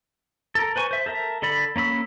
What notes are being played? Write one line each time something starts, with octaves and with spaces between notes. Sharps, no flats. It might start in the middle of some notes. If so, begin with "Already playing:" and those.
A4 A#4
B4 C5 G#5 C#6
C5 E5
A4 A#4 E5
D3 A4 D5 B5
A#3 C#4 B5 E6